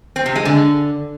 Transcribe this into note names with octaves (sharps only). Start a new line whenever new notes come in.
C4
C3
G#3
D3